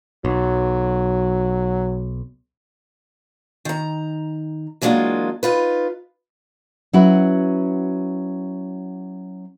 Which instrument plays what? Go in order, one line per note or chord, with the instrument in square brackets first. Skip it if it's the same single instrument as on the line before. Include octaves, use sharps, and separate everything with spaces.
[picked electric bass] B1 [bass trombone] F#3
[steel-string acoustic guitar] D#3 A#5
E3 F#3 G#3 A#3 D4 F4
D#4 F4 B4
[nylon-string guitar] F#3 C#4 E4 F#4 B4